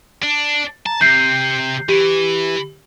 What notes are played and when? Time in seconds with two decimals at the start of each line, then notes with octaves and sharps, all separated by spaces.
0.23 D4
0.86 A5 A#5
1.01 C3 G6 C7
1.89 E3 G4